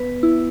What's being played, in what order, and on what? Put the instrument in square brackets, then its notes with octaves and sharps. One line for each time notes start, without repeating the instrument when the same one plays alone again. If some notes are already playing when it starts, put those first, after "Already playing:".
Already playing: [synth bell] B3 B4
E4